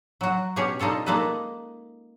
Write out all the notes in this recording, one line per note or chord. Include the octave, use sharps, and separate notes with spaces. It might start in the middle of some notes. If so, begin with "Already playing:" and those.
F#3 F#4
B2 C#4 G4 G#4 C#5
G3 D#4 F4 A4 C#5
G#3 A#3 D#4 A4 B4